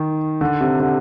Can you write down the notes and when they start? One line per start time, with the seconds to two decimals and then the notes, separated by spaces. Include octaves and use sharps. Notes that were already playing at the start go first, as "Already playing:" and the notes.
Already playing: D#3
0.41 D3
0.61 C3
0.80 D3